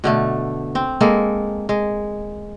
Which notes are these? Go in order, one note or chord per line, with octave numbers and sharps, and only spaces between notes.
B2 D3 A3
C4
G#3 A#3 A4
G#3